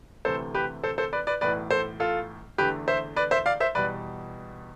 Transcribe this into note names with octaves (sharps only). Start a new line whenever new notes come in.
D2 C3 E3 A3 A4 C5
G4 B4
A4 C5
A4 C5
B4 D5
B4 D5
B1 A2 E3 B4 D5
A4 C5
F4 A4
E2 D3 A3 G4 B4
C5 E5
B4 D5
C5 E5
D5 F5
C5 E5
E2 B2 G3 B4 D5